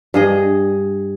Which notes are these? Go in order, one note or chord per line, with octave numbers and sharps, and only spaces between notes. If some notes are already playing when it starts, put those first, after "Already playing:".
G2 G#4 D#5